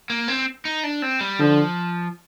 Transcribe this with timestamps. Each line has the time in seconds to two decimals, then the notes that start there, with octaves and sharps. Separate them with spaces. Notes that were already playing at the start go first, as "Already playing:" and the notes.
0.10 A#3
0.28 C4
0.65 D#4
0.84 D4
1.02 C4
1.21 G3
1.39 D3 F3